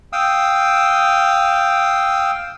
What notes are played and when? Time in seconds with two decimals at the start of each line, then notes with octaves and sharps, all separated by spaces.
0.13 F5 G5 D#6 E6